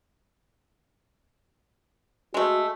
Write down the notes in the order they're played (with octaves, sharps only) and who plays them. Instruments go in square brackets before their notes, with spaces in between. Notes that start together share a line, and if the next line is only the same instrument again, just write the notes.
[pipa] G#3 A3 [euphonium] F#4